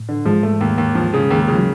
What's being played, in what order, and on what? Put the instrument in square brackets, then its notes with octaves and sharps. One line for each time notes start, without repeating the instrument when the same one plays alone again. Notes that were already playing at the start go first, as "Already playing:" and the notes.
Already playing: [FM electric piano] A2
[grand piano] D3
[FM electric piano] G#2 G#3 [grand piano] F3
[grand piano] A3
D#2
D#2
F3
C#3
D#2
[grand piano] C#3 [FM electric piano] F3
[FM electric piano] F#3